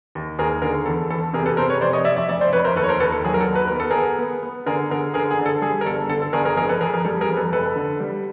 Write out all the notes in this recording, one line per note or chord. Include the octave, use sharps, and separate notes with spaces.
D#2
D#2 G#4 A#4
D3 G#4 A#4
E2 A4
E2 A4
C3 G#4 A#4
A4 B4
C3 A#4 C5
B4 C#5
F1 C5 D5
C#5 D#5
F1 D5 E5
D5 E5
F1 D5 E5
C5 D5
F1 B4 C#5
A#4 C5
D#2 A4 B4
C#5
A#4 C5
D#2 A4 B4
A4
F#3 G#4
A#4
A4
D#2
B4
B3 A#4
A4
B3 G#4 A#4
B3
B3
D3 G#4 A#4
D3 G#4 A#4
D3 G#4 A#4
G#4
D3
A4
G3 G#4
A#4
G1 A4
D3 A4
A4
G1 G#4 A#4
G#4 A#4
F1 G#4 A#4
A4 B4
F2 G#4 A#4
G#4 A#4
G3 A4
G#4 A#4
F2
A4 B4
F1 A4 B4
D3
G3